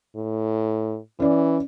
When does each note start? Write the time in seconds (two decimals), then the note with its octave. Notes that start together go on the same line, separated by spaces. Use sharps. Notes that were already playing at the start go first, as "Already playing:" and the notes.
0.16 A2
1.20 E3 C#4 D5